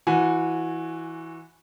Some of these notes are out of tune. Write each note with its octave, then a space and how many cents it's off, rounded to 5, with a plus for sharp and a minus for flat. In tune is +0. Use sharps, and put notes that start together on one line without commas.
E3 +0 F#4 -20 G#5 +0